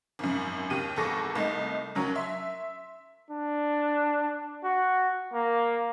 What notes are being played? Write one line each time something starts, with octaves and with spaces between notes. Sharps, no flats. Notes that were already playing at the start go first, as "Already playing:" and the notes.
G#1 F#2
D#2 G4 D#7
G#1 E2 A4 C#6 D6 A#6
C2 A3 D#4
D#2 F#3 C#4 A#4
E5 C6
D4
F#4
A#3